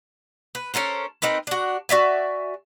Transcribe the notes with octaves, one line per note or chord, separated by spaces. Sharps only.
B4
C#4 A4 A#4 C5
C4 D#4 A#4 B4
D4 F#4
F#4 D5 E5 G#5